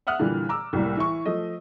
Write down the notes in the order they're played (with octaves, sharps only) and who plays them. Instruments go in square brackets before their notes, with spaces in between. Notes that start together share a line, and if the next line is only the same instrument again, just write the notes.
[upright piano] E5 F#5 D#6 F6 F#6
A#2 D3 E3 G3
A#5 D6 E6
C2 A2 G3 A#3
E3 E4 C#6
F3 A3 D#5